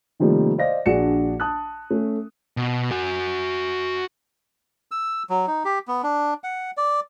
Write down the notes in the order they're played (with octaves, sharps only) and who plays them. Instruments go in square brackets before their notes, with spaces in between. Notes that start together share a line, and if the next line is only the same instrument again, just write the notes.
[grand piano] C3 D#3 F3 G3 A3 A#3
C5 D5 D#5 F5 A#6
A#1 D4 F#4 G#4 C#7 E7
A5 D#6 F#6
A3 C#4
[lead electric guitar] B2
F#4 G#5
[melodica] E6
F#3
D#4
G4
B3
D4
F#5
D5